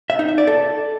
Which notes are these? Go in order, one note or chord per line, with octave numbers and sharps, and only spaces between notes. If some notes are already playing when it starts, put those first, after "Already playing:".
E5
D#4
E5
D5
A4